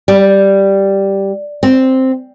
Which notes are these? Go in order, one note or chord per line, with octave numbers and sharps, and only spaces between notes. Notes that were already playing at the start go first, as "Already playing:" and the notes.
G3
C4